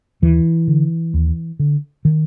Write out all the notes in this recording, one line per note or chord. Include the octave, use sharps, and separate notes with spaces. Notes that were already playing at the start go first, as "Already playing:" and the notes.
D#2 E3
D3
D#2
D3
D#3